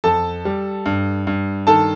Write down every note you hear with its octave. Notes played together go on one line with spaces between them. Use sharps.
F2 A4 A5
G3
G2
G2
D#3 A4 A5